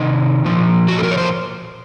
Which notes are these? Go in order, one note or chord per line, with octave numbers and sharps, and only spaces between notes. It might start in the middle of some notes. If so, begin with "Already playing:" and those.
Already playing: C3 D#3 D#4
A#2 F3
F#4
A4
A#4
C#5
C5